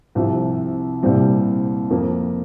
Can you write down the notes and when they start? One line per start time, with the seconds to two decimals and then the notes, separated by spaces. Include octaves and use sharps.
0.15 C2 C3 F3
1.03 C2 A#2 G3 C4
1.90 F2 F3 A#3